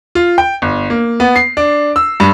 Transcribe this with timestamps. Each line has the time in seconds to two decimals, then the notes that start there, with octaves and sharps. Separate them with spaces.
0.15 F4
0.38 G5
0.62 G1
0.90 A#3
1.20 B3
1.36 C7
1.57 D4
1.96 E6
2.20 G2